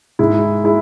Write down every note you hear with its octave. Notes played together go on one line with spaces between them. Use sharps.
G#2 G#3 E4
G#3 E4